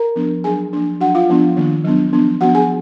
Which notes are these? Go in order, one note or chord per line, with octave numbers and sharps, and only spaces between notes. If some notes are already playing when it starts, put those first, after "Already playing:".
Already playing: A#4 A#5
F3 B3 D4
F#3 D4 G#4 G#5
F3 A#3 D4
F#3 D4 F#4 F#5
F4 F5
F3 G#3 B3 D4
D#3 A#3 D4
F#3 B3 D4
F3 B3 D4
F3 B3 D4 F#4 F#5
G#4 G#5